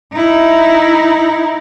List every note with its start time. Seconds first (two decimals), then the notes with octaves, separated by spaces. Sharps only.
0.13 D#4 E4